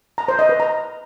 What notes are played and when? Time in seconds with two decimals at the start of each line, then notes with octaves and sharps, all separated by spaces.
0.18 A#5
0.28 C5
0.39 D#5
0.49 B4
0.60 A#5